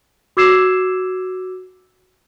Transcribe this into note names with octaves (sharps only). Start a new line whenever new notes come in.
F#4 D6 E6 G#6 C7 E7